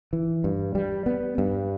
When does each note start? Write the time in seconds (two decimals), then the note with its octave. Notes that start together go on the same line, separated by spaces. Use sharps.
0.13 E3
0.44 G2
0.75 G3
1.06 B3
1.38 G2